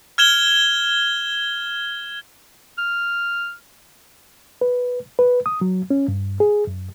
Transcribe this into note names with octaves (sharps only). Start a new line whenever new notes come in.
F6 G#6 E7 G7
F6
B4
B4
D#6
F#3
C#4
G2
G#4
F#2